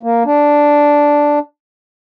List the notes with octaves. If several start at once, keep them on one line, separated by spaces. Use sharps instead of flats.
A#3
D4